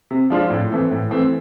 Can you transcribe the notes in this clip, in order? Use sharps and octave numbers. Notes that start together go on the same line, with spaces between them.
C3
F3 G#3 D4 F4
A2
E3 A3 C4
A2
E3 A3 C4